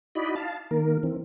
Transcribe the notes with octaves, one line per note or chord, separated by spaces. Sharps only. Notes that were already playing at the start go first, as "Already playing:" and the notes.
D#4 E4 F#4 D5 D#5 B5
F5 A5
D#3 A#3 A#4
E3 C4